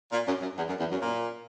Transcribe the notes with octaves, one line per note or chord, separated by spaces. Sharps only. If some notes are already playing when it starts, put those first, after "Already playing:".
A#2
F#2
F#2
E2
F#2
E2
F#2
A#2